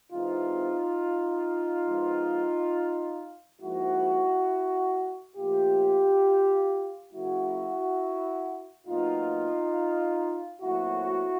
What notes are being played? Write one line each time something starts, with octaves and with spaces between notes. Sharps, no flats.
C3 E3 G#3 C4 D#4 F4
G#2 F3 G#3 B3
G#2 F3 A#3 E4 F#4
A#2 F3 A3 F4 G4
C#3 F#3 A#3 E4 F#4
A#2 F#3 B3 D#4 F4
A#2 F#3 A3 C4 E4 F#4